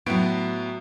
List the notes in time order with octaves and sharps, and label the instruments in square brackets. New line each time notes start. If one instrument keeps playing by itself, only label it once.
[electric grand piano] A2 B3 D7 [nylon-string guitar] F#3 A3